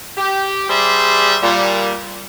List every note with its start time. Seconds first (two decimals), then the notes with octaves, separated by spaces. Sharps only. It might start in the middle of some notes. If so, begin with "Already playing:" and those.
0.17 G4
0.69 G3 G#4 C5 D5 E5
1.42 A#2 G3